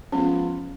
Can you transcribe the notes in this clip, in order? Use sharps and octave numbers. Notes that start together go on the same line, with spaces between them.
F3 G#3 B3 C#4 F4